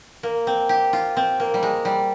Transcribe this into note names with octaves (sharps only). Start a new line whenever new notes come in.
A#3
C4
G4
F4
C4
A#3
G3
G#3
G3